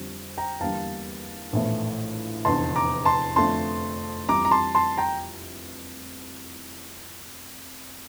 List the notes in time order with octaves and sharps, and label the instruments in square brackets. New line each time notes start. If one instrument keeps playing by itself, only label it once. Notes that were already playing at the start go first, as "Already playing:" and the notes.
Already playing: [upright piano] F2 D3 G3 C4
[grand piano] G5 A#5
[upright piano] E2 D3 G3 A#3 [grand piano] F5 A5
[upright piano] A#1 A2 E3 A3
[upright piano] F1 E2 D3 [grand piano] A5 C6
[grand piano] A#5 D6
A5 C6
[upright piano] F2 D3 A3 D4 F4 [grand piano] A5 C6
[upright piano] F2 E3 G3 [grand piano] A#5 D6
[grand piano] A#5
A5 C6
A5 C6
G5 A#5